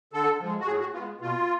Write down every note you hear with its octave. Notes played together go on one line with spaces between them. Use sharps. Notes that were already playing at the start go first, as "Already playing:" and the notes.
D3 A4
F3 G#3
F#4
A2 G#4
F#4
G#3 B3 F4
B2 F4